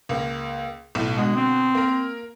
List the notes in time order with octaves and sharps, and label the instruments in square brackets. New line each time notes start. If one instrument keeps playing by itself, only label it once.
[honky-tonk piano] C#2 A#3
B1 A2
[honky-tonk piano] B2 D3 F#4 [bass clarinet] G#3
[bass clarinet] C4
[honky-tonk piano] A#3 A#4